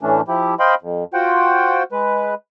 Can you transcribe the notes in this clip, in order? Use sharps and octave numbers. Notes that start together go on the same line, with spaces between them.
A2 E3 A3 C#4 D4
F3 E4 G4
C5 D#5 F5 G5 B5 C6
F2
F4 F#4 C5 F#5 G5
G#3 B4